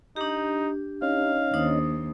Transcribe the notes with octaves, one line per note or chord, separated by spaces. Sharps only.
D4 D#4 G4
C#4 D#4 F5
D#2 D4 C5 D#6